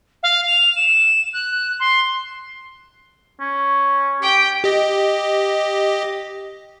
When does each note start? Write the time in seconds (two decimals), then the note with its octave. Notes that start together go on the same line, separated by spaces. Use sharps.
0.23 F5
0.46 F7
0.76 E7
1.33 F#6
1.80 C6
3.40 C#4
4.22 G4 G5
4.64 G4 D#5